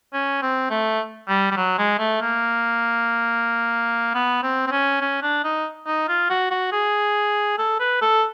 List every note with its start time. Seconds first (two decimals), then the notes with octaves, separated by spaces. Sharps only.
0.14 C#4
0.42 C4
0.70 A3
1.28 G3
1.51 G3
1.57 F#3
1.78 G#3
1.99 A3
2.21 A#3
4.15 B3
4.43 C4
4.67 C4
4.71 C#4
5.01 C#4
5.22 D4
5.44 D#4
5.87 D#4
6.08 F4
6.30 F#4
6.51 F#4
6.72 G#4
7.58 A4
7.80 B4
8.01 A4